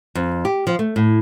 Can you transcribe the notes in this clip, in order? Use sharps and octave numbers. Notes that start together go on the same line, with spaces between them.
F2
G4
F3
A3
A2